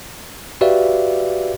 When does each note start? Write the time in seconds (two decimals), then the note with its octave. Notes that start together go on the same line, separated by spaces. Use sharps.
0.61 F#4 G4 B4 D5 E5 F5